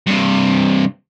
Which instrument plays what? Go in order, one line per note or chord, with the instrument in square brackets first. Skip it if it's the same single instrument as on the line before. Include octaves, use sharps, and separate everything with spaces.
[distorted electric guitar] G2 C3